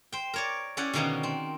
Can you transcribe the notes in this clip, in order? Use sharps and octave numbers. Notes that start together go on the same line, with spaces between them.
C5 G5
A#4 C#5 D5
C#4 E4 D5 F#5
B2 D3 D#3 A#3 B3 C#4
C4